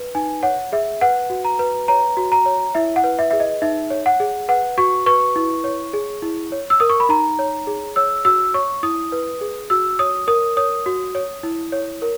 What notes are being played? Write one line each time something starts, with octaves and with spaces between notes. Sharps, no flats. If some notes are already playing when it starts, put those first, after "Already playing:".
Already playing: B4
D#4 G#5
C#5 F#5
G#4 E5
B4 F#5
F#4
A#5
B4
C#5 A#5
F#4
A#5
C#5
E4 E5
F#5
B4
E5
G#4 E5
D#5
D#4 E5
C#5
F#5
G#4
B4 F#5
F#4 C#6
B4 C#6
E4
C#5
G#4
E4
C#5
E6
A#4 D#6
C#6
B5
D#4 A#5
C#5
G#4
C#5 E6
F#4 E6
C#5 C#6
E4 D#6
B4
G#4
F#4 E6
C#5 D#6
A#4 D#6
C#5 D#6
F#4
C#5
E4
C#5
A#4